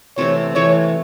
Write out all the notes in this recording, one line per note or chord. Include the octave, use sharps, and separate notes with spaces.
C3 E3 A3 C4 C#5
C3 E3 A3 C4 C#5